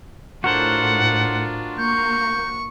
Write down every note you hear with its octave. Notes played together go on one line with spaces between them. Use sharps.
A2 D4 F4 F#4 A#4 C5 F#5
A#3 C#6 G6